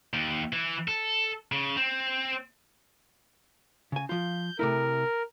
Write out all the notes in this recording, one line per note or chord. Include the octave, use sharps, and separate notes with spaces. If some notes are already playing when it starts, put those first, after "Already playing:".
D#2
E3
A4
C#3
C4
C#3 G#5
F3 F4 G6
C3 A3 E4 A#4